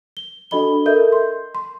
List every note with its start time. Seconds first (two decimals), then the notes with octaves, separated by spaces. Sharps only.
0.17 G7
0.51 D4 F#4 A4 D#5 B5 G7
0.86 A4 A#4 D#5 E5 G6
1.12 C6
1.55 C6